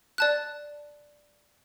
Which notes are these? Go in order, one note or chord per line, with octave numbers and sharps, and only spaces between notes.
D5 A5 F#6